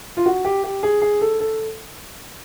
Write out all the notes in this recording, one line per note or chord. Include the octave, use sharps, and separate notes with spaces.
F4
F#4
G4
G4
G#4
G#4
A4
A4